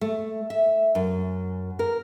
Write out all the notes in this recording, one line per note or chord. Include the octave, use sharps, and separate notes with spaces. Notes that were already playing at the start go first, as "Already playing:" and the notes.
A3
E5
F#2
A#4